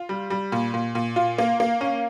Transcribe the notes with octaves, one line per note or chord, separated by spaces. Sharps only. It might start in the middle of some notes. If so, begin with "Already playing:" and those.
Already playing: F4
G3
G3
A#2
A#2
A#2
F4
A#3
A#3
C#4